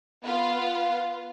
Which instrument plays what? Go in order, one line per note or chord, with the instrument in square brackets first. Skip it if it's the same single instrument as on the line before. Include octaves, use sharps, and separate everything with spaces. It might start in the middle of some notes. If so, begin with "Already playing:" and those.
[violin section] B3 F4 B4 F5